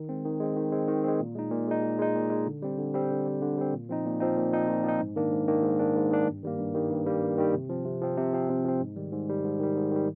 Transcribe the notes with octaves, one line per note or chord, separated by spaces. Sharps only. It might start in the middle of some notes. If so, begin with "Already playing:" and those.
Already playing: D#3
G#3 C4
D#3
G#3 C4
D#3
G#3 C4
D#3
G#3 C4
A#2
G#3 D#4
A#2
G#3 D#4
A#2
G#3 D#4
A#2
G#3 D#4
D3
G3 C4
D3
G3 C4
D3
G3 C4
D3
G3 C4
A#2
F3 C4 D#4
A#2
F3 C4 D#4
A#2
F3 C4 D#4
A#2
F3 C4 D#4
G#2
D#3 A#3 D4
G#2
D#3 A#3 D4
G#2
D#3 A#3 D4
G#2
D#3 A#3 D4
G2
D#3 G3 A#3
G2
D#3 G3 A#3
G2
D#3 G3 A#3
G2
D#3 G3 A#3
C3
F3 C4
C3
F3 C4
C3
F3 C4
C3
F3 C4
G#2
D#3 G3
G#2
D#3 G3
G#2
D#3 G3
G#2
D#3 G3